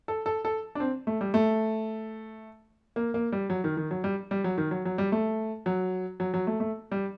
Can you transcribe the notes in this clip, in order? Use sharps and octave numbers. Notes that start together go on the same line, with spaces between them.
A4
A4
A4
D4
C4
A3
G3
A3
A#3
A#3
G3
F#3
D#3
D#3
F#3
G3
G3
F#3
D#3
F#3
F#3
G3
A3
F#3
F#3
F#3
A3
A3
G3